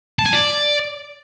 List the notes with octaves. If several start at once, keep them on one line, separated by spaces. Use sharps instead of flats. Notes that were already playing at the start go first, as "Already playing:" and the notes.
A5
G#5
D5